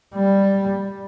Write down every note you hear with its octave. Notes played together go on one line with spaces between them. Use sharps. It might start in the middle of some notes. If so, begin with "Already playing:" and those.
G3